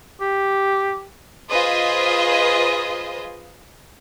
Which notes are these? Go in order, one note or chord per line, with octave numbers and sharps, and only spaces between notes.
G4
F4 G#4 B4 C5 D#5 C6